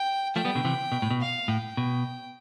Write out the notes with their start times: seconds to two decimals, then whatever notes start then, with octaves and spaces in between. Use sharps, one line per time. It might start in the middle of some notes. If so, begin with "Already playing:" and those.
Already playing: G5
0.35 F3 A3 G5
0.45 G3 B3
0.55 B2 D3
0.65 C3 E3
0.92 B2
1.02 A2
1.10 B2
1.21 F5
1.48 A2 G5
1.77 B2